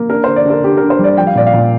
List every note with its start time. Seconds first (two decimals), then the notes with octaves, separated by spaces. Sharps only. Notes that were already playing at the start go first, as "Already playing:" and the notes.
Already playing: A#3
0.10 D4 A#4
0.24 D3 C5
0.36 D5
0.45 D3 A#4
0.64 D3 G4
0.77 D3 A#4
0.90 C5
0.99 G3 D5
1.17 F3 G5
1.27 F5
1.35 A#2 D5
1.47 F5
1.53 A#2